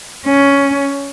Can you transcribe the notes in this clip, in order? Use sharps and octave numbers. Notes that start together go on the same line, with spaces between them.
C#4